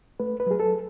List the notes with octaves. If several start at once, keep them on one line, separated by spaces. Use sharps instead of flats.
A3 B4
B4
F#3 G#4
A4